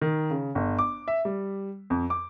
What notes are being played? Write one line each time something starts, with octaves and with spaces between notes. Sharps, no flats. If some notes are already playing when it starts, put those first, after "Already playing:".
D#3
C#3
G1
D6
E5
G3
F2
D6